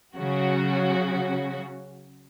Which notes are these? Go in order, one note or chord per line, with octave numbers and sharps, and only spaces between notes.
C#3 F#3 F#4